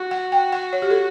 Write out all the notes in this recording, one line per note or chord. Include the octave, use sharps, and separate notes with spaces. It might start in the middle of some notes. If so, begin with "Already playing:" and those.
Already playing: F#4
F#5
G5
F#5
C#5
G4
A4